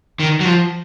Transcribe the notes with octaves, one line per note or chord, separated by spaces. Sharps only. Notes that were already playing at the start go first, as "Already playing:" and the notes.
D#3
F#3
F3